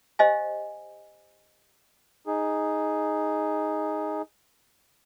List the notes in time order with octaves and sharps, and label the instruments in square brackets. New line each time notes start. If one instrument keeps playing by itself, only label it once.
[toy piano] G4 C5 D#5 F5 G#5
[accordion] D#4 G#4